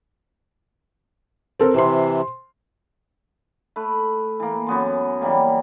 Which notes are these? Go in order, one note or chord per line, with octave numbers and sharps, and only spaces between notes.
C4 A4 A#4
C3 E3 C5 C6
A3 B4
E3 A#3
F#2 B3 C6
E3 F#3 G3 A#3